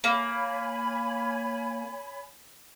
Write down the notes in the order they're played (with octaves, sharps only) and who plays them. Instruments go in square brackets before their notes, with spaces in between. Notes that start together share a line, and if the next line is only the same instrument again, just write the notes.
[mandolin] A#3 [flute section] C#5 G#5 B5